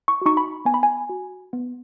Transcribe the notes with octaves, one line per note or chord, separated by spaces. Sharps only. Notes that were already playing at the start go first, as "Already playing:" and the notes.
C#6
D#4 F#4 C#6
B5
B3 G#5
B5
G#5
F#4
B3